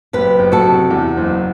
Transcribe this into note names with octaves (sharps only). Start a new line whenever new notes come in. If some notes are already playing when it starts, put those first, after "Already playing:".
F#1 G4 B4
F#1
F#4 A4
C3
E2
F#1